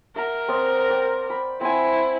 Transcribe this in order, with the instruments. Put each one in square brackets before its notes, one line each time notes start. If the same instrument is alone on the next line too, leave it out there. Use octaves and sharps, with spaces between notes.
[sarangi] A#4 [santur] E5 F#5 A#5
[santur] C4 D5 D#5
D5 G5
B5
[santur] C4 F#5 G#5 [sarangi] E4